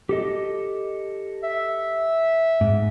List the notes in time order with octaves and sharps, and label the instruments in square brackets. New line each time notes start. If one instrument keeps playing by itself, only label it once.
[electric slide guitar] G4 A4 D#5
[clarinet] E5
[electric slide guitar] G#2